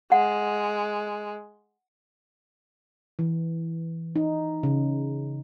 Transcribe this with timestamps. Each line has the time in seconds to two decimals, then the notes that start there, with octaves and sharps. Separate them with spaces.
0.12 G#3 F#5
3.19 E3
4.16 D#4
4.63 C#3